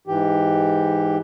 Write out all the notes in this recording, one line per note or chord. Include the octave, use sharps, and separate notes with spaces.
G#2 E3 G4